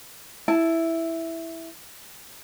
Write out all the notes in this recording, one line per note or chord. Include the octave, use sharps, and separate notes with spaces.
E4 A5